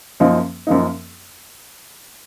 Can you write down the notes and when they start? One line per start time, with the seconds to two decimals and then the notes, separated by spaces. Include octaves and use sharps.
0.20 F#2 F3 A#3 D#4
0.67 F#2 F3 A#3 D#4